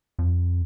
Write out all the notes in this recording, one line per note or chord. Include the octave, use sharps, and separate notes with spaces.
F2